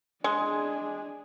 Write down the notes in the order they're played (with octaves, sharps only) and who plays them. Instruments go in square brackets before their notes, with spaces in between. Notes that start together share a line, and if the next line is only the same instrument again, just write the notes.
[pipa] G#3 [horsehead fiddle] D4 G#4